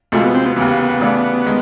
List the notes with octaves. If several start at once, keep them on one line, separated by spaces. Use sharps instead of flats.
D2 C3 F3 G#3 A3
B3
C4
B3
D#2 C#3 E3 B3
C#3 E3 A3 D4
D#3 G#3